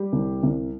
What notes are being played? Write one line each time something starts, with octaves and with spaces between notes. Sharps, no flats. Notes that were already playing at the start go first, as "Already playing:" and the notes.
Already playing: G3 G4
C2
C2